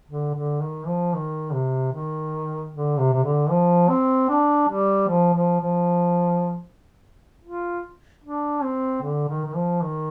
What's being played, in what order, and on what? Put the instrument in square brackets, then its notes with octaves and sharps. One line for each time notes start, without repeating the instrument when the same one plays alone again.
[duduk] D3
D3
D#3
F3
D#3
C3
D#3
D3
C3
C3
D3
F3
C4
D4
G3
F3
F3
F3
F4
D4
C4
D3
D#3
D#3
F3
D#3